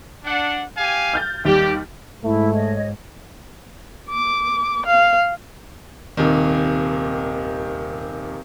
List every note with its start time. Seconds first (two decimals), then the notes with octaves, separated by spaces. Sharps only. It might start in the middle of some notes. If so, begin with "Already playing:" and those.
0.25 D4 F#5
0.77 G4 F5 G#5
1.14 F6 G6 A6
1.45 D#2 G3 G4
2.24 G#2 A3 E4
2.53 C#5 D#5
4.10 D6
4.87 F5
6.17 D#1 C3 D#3